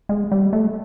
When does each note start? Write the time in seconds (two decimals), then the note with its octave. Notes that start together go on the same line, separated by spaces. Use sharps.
0.09 G#3
0.32 G3
0.53 A3